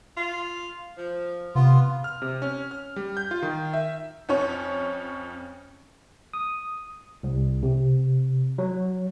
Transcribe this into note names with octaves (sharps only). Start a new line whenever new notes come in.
F4
F3
C3 B3 F4
F6
C3
C#4
F6
G3
G6
F4
D#3
E5
F2 C#4 C#5
D#6
C2
C3
F#3